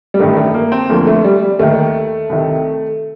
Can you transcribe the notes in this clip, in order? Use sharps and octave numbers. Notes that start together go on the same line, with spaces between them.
G3
A1 G2 D#3 A3
A3
A#3
C4
D2 D3 F3 A#3
A3
G3
G3
D#2 D#3 A3
C2 C3 D#3